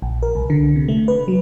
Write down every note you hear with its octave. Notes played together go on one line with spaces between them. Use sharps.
A#1
A#4
C2
D3
C3
A3
B4
F#3